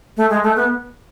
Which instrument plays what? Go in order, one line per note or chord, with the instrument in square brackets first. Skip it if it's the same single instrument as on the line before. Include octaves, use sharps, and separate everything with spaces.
[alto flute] A3
G#3
A3
B3